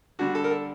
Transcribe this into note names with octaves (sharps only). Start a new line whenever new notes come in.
D3 G3 D4 F#4
A4
A#4
A4